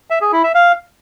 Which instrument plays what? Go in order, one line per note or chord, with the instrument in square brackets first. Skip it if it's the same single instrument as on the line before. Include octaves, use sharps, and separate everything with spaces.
[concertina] E5
G#4
E4
E5
F5